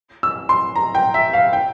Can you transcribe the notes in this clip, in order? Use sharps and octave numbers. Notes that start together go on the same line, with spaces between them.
E6
C6
A#5
G5
E5
F5
G5